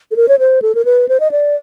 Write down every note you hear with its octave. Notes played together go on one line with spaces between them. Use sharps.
A4
A#4
C#5
C5
A4
A#4
B4
C5
D#5
D5